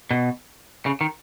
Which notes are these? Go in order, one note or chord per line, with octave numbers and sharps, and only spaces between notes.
B2
C#3
D#3